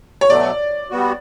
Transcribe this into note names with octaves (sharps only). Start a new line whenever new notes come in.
C#5
B2 F#3 A3 D5
G3 B3 F#4